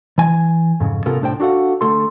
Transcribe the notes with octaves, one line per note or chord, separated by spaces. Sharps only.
E3 G#5
F2 G#2 C#3
C3 B3 C#4 F4 A4 A#4
C2 A2 D4 C5 G5
D4 F#4 A4 F5 F#5
D3 A3 A4 C6